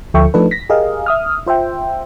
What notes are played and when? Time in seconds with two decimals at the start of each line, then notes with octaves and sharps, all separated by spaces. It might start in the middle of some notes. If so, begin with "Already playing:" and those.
0.14 D2 F3 A4 E5 G5 C#6
0.34 F3 A3 D4 D#4 A4 B4
0.51 A#6 B6
0.70 G4 G#4 A#4 D#5 F5
1.06 E5 D#6 F6
1.46 F4 C5 E5 G5